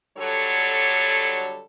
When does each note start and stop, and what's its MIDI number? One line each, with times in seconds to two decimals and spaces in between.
0.17 1.60 50
0.17 1.60 54
0.17 1.60 55
0.17 1.60 69
0.17 1.60 73